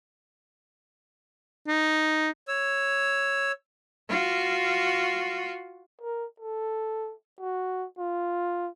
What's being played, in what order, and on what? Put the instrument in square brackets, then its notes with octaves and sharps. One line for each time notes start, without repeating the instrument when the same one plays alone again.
[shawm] D#4
[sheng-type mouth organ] C#5 E6
[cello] F4 F#4
[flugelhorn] A#4
A4
F#4
F4